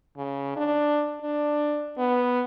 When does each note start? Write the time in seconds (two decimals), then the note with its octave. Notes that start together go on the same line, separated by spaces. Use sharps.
0.17 C#3
0.57 D4
1.22 D4
1.98 B3